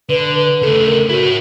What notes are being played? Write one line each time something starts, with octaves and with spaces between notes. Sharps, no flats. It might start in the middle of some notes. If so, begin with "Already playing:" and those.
D3 B4
C#3 A3 A4
A#4
E4 F#4 C#5